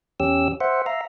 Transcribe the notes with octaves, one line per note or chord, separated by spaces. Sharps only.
E2 C#4 G4 E6
C5 E5 F#5
E5 F5 A#5